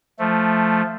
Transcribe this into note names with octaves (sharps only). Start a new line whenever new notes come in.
F3 A3